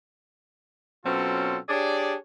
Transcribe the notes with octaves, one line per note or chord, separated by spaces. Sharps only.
B2 F#3 C4 C#4 F4 A4
D4 G4 G#4 C#5 D5